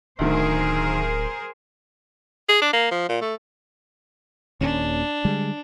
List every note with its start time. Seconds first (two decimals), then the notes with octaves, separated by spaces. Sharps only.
0.19 D1 D2 D#3 G#4 A#4 C5
2.49 G#4
2.62 D4
2.73 A#3
2.91 F3
3.09 A#2
3.22 A3
4.61 D#1 D#2 C#4 D4
5.25 D3 G3 G#3